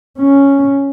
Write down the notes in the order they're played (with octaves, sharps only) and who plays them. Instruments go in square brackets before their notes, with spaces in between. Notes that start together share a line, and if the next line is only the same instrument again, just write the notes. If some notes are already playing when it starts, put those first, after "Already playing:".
[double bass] C#4